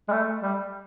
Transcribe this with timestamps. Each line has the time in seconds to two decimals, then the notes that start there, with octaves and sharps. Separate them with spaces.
0.09 G#3
0.12 A3
0.43 G3